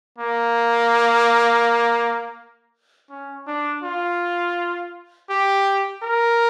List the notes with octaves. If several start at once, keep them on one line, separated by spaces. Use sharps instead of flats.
A#3
C#4
D4
F4
G4
A#4